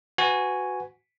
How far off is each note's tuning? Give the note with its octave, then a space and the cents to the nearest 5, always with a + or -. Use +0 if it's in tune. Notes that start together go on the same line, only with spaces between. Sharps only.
F#4 +0 B4 +25 G#5 +0